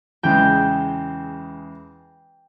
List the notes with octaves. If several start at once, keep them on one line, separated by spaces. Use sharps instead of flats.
E2 C#3 G#3 G5